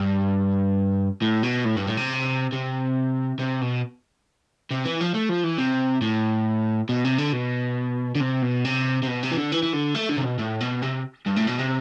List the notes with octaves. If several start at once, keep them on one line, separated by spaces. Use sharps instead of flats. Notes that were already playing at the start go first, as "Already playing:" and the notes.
Already playing: G2
A2
B2
A2
G2
A2
C3
C3
C3
B2
C3
E3
F3
A3
F3
E3
C3
A2
B2
C3
D3
B2
D3
C3
B2
C3
C3
B2
C3
E3
D3
E3
E3
D3
A3
D3
C3
B2
A2
B2
C3
G2
A2
B2
C3